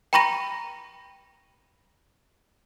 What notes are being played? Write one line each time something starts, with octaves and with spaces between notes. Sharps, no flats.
G5 A#5 B5 C#6 A#6 D#7